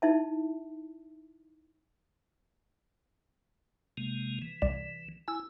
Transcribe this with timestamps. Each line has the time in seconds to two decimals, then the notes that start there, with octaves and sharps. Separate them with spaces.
0.02 D#4 E4 E5 A5
3.97 C3 G#3 A#3
4.42 E3
4.62 C2 D5 E7
5.28 E4 G#5 E6